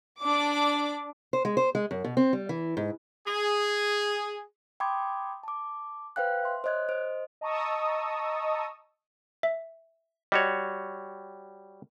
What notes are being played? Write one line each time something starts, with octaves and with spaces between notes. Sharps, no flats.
D4 D6
C5
G#3
C5
G#3
F#2
B2
C4
G3
E3
G#2
G#4
G5 B5 C6 D6 D#6 G#6
A5 D6
B4 C5 F5 G5 F#6
E5 C6
C5 C#5 D#5 F#6 G#6
C5 D#5
D#5 A5 A#5 C#6 D#6 E6
E5
G3 F#4 C#5 D#5